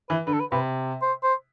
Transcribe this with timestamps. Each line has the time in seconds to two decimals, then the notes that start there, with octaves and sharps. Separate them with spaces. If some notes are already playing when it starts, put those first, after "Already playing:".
0.09 E3 B4
0.26 D3 B4
0.33 A4
0.40 B4
0.52 C3 B4
1.02 C5
1.23 C5